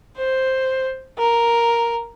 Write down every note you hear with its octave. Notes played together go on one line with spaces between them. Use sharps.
C5
A#4